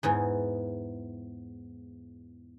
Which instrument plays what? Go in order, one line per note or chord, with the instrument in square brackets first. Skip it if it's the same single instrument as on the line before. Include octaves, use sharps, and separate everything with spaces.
[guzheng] E2 G#2 E3